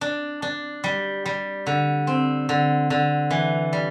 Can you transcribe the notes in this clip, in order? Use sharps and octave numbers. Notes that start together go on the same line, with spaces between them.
D4
D4
G3
G3
D3
C4
D3
D3
E3
G3